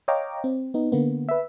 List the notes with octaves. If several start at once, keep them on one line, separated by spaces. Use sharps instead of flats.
C#5 D#5 F5 G5 A#5 D6
C4
B3 D#4
D3 A#3 B3
B4 E5